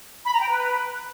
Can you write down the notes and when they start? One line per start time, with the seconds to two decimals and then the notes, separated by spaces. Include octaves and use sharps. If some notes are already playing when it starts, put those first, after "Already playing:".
0.25 B5
0.33 A#5
0.41 G5
0.50 B4